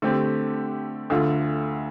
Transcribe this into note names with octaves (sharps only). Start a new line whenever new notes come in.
D3 A3 C4 G4
D2 D3 A3 F4